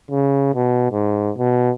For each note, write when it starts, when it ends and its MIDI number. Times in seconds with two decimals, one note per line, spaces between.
0.11 0.53 49
0.55 0.90 47
0.92 1.31 44
1.37 1.71 47